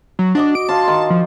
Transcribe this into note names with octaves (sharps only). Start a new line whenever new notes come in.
F#3
D4 F#4 D#5 D6
D7
F4 A5 C6
D#3
F3